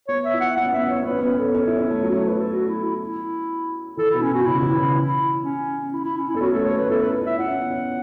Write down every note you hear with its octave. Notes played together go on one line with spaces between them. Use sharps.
B3 C#5
E5
E4
F#5
B3 F#5
C#4
B3 E5
C#4
B3
C#5
C#4
B3
C#4 B4
B3
C#4 B4
B3 A4
C#4
E4
C#4
A3
F#3 F#4
A3 C#5
F#3 B4
A4
F#4
E4
E4
E4
E3 A4
B2 E4
C#4
B2 F#4
C#3 E4
E3
C#3
E3
E4
C#4
E4
E4
C#4
E4
B3 A4
C#4 F#4
A3 A4
B3
C#5
B3 B4
E4 A4
B4
C#4
E4 E5
E4 F#5
C#4
B3
C#4